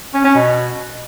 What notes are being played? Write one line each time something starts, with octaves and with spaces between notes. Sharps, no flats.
C#4
C#4
B2